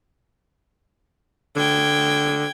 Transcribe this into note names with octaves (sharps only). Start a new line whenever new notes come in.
D3 G5 G#6